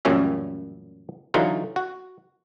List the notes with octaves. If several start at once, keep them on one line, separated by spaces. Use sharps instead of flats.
A1 F#2 A#2 G3 C#4 E5
D3 E3 F#3 D#4 F4 F#4
F#4